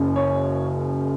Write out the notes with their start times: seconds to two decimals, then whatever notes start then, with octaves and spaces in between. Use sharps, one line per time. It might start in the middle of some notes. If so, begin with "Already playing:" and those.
Already playing: F#1 F#2 C#3
0.16 C#5